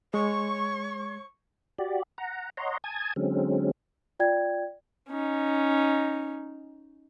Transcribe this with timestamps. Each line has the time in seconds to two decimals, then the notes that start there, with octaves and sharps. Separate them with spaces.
0.14 G#3 C#5 C#6
1.79 F#4 G4 D5
2.18 F#5 A#5
2.57 C#5 D#5 F#5 A#5 C6
2.84 G#5 A5 D#6 G#6
3.16 D3 F#3 G#3 C4 C#4
4.19 F4 D5 G5 G#6
5.09 C#4 D#4